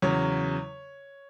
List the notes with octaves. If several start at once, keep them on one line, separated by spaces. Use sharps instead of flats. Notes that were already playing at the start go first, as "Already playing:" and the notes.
E2 C#3 F#3 C#5